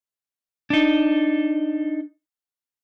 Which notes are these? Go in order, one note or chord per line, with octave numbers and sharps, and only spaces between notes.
D4 D#4